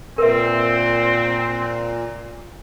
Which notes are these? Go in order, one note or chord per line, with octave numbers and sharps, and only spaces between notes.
A#2 C4 A#4 B4 E5